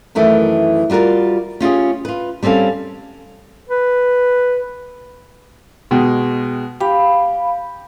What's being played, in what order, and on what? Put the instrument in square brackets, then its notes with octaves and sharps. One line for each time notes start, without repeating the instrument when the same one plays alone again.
[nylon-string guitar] F#2 D#3 E3 A3
G3 F4 F#4 A#4 D5
C#4 F4 G4 G#4
F4 B4
G3 C4 C#4 A4 F5
[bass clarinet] B4
[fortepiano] B2 G#3 G5
[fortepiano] G4 [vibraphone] F5 B5